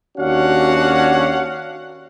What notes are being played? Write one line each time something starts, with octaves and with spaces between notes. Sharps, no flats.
D#2 C#4 D4 F#4 F5 F#5